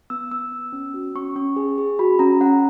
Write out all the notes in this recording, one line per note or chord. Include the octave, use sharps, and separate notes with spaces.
B3 E6
B3 E6
B3
C#4
F#4
C#4 C#6
C#4 C#6
G#4
G#4
F#4 B5
C#4 A#5
C#4 F#5